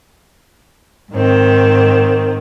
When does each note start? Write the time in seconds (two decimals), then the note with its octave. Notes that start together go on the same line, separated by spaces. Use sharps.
1.12 G#2 D#3 C4